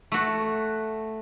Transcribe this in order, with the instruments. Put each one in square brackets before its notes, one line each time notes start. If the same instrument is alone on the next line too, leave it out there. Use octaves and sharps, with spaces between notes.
[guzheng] A3 F#4